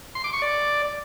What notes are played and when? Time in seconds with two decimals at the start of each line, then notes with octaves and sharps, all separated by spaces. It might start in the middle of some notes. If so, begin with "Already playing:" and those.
0.15 C6
0.24 D6
0.33 C#6
0.42 D5